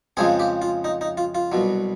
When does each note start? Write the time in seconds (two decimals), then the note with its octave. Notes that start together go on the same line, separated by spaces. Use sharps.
0.17 F2 C#3 F3 G#3 C4 G#4
0.40 G4
0.62 F4
0.84 D#4
1.01 D#4
1.17 F4
1.35 F4
1.52 C2 B2 F#3